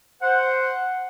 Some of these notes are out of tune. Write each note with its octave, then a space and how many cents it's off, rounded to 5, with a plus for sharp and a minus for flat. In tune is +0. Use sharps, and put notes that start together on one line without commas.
C5 +0 F#5 +0